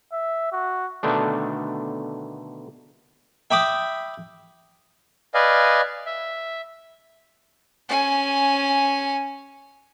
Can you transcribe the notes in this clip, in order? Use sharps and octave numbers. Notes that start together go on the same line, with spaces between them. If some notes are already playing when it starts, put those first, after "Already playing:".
E5
F#4
B2 D3 D#3 A3 D4
E5 G5 B5 D6 D#6
B4 D5 D#5 F5 G#5
E5
C#4 G#5